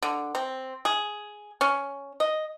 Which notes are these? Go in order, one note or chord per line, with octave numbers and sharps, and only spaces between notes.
D3
C4
G#4
C#4
D#5